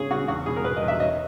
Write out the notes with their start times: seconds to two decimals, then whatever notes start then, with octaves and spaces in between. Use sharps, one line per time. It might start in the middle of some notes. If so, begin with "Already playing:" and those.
Already playing: C#3 C#4 G#4
0.11 C#3 F#4
0.28 E2 F#4
0.46 B2 G#4
0.56 A#4
0.64 B2 B4
0.76 D#5
0.82 E2
0.88 E5
1.00 C#4 D#5